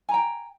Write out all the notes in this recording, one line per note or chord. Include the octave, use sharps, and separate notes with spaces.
G5 G#5 A#5